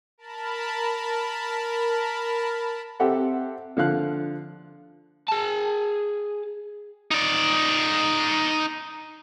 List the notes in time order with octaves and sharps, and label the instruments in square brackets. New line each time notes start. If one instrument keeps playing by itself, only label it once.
[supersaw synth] A#4 A5 B5
[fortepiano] C4 G4 A4 E5 F#5
D3 F3 F5 F#6
[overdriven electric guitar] G#4 A5
[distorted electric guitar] D#4 D5